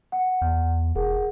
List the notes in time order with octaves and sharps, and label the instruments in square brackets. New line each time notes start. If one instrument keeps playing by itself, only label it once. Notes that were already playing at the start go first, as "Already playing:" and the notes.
[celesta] F#5
[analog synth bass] E2
[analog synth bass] E1 [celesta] G#4 A#4 F#5